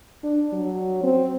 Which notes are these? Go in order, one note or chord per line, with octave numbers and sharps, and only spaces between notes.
D4
F#3
C4